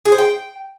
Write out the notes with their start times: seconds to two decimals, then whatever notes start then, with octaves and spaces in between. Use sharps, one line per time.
0.05 G#4
0.12 C5
0.18 G5